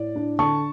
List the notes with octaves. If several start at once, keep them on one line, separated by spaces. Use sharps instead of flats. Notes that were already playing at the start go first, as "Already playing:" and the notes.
Already playing: A2 D5
D4
D3 A5 C#6